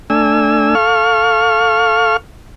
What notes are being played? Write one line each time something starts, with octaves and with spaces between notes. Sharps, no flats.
A3 D4 G#5 E6
A4 F5 C#6 F6